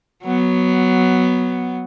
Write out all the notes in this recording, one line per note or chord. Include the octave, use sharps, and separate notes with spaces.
F#3 B3